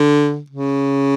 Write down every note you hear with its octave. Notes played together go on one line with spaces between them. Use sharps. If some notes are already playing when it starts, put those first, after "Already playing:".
Already playing: D3
C#3